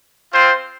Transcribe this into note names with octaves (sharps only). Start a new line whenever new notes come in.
C4 F4 C5